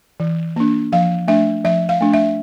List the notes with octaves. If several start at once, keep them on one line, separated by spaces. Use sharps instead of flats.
E3
A#3 D4
F3 F5
A3 D4 E5
F3 E5
F5
A3 D4
E5